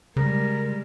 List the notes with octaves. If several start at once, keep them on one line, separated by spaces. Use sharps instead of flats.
C#3 G3 G#3 A#4